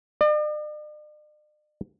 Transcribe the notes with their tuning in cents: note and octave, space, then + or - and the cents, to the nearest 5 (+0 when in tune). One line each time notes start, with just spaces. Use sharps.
D5 +45